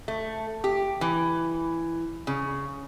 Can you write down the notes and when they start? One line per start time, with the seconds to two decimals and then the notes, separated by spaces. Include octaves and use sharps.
0.08 A3
0.64 G4
1.01 E3
2.27 C#3